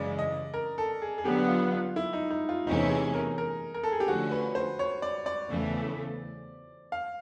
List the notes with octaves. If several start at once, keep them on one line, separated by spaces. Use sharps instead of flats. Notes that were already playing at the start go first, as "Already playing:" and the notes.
Already playing: F#2 C#3 E3 G#3 D5
D#5
A#4
A4
G#4
G#4
D3 F#3 B3 G4
F4
F4
E4
D#4
D#4
F4
E2 C3 E3 A3 C#4 D#4
G#4
A#4
A#4
A#4
A4
G#4
G4
D3 F3 A3 C#4 F#4
B4
C5
C#5
D5
D5
E2 C#3 E3 A3
F5